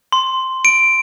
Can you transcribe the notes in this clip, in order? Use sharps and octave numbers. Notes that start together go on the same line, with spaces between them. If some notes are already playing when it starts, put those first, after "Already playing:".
C6
D7